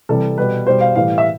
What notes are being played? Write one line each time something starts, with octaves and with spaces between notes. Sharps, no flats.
C3 E3 G3 A4
B2 G3 B4
B2 G3 C5
F5
A2 E3 G3 F5
E5